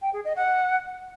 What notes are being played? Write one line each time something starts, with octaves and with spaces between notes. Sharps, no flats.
G5
G#4
D#5
F#5